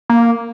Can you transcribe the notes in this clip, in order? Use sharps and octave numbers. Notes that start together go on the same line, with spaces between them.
A#3